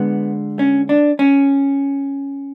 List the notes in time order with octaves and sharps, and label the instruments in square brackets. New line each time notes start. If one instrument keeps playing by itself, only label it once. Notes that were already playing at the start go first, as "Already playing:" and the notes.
Already playing: [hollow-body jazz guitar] D3 G#3 B3
C#4
D4
C#4